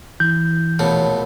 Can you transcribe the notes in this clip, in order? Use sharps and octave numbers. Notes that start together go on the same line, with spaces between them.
E3 G6
A#1 B2 A3 C#5